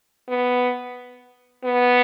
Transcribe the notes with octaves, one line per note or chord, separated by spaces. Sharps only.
B3
B3